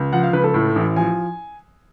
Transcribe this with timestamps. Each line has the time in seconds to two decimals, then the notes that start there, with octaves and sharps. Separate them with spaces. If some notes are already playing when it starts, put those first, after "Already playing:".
Already playing: C#2
0.12 F3 F#5
0.23 F5
0.33 C#2 B4
0.44 A4
0.54 A2
0.76 A1
0.96 F3 G#5